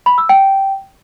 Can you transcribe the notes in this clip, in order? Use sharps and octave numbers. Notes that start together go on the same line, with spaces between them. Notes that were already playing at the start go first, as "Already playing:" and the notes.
B5
E6
G5